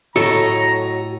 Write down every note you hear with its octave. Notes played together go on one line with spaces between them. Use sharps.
A2 F#4 A4 C#5 D#5 A#5